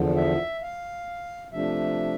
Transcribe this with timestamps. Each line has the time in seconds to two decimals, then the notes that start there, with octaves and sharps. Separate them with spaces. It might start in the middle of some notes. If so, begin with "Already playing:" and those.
Already playing: E2 D3 F3
0.16 E5
0.62 F5
1.53 C3 F3 A3 D4 E5